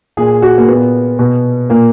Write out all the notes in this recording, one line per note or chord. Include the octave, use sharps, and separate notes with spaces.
A#2 G#4
F#4
A#3
A#2 B3
B2
A#2 A#3